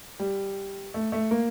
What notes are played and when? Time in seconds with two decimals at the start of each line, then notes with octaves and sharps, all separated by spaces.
0.20 G3
0.94 A3
1.12 A3
1.31 A#3